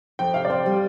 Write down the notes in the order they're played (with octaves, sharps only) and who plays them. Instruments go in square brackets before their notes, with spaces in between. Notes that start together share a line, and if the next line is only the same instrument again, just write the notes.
[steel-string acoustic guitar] F2 [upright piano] G5
[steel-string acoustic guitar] C3 [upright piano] F5
[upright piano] D5
[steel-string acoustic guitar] F2 [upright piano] C5
[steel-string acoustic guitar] G3